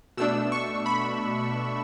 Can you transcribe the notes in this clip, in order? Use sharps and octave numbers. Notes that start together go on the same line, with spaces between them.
B2 A3 D4 E6
C#6
B5